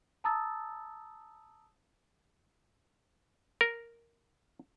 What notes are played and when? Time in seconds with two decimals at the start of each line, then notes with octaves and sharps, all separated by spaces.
0.24 A5 A#5 D#6 E6 A6
3.61 A#4